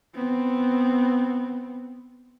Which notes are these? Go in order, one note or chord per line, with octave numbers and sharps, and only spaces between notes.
B3 C4